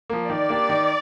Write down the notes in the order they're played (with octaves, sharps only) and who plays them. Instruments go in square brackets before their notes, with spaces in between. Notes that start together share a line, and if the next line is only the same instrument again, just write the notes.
[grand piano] F3 A#3
[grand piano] D#3 [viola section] D5
[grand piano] A#3 D4 G4
D#3